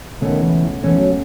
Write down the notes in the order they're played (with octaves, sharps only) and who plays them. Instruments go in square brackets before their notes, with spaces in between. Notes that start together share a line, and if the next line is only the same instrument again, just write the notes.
[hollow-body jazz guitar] C#2 B2 A3 C#4 [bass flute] D#3
[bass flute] E3
[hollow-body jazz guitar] C#2 B2 A3 C#4 [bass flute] E3
[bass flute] F#3